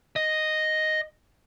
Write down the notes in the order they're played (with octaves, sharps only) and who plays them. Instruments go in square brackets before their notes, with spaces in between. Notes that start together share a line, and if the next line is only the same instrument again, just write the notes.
[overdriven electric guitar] D#5